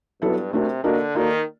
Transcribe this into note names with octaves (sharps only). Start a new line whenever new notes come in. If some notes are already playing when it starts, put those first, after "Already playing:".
G2 F#3 B3 E4 A4
C3 A3 D4 F#4 A#4
D3 A#3 D4 F#4 A#4 D#5
D#3 A#3 D#4 F#4 A4 D5